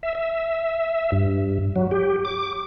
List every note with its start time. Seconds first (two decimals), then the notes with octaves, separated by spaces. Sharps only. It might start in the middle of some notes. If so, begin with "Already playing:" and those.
0.03 E5
0.15 E5
1.12 G2
1.76 F#3
1.91 G4
2.25 D6